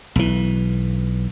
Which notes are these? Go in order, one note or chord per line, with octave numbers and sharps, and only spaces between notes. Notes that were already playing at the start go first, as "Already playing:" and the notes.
B1 E3